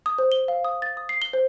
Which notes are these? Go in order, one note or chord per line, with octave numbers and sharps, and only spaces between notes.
D#6
C5
G7
F5
D#6
A6
D#6
C7
G7
C5